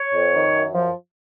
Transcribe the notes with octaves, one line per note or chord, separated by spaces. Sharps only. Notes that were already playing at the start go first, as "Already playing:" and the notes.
Already playing: C#5
F2
D#3
F#2
F3